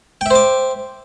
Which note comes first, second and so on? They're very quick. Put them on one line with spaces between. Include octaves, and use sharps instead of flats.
G5 E5 C5 D6